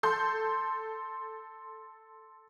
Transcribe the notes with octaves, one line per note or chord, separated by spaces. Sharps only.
A4 C6 G6